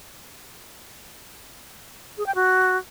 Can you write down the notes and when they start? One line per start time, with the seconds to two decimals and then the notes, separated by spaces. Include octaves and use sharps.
2.18 G#4
2.26 G5
2.35 F#4